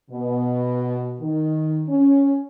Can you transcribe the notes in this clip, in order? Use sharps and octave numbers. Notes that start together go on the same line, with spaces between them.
B2
D#3
C#4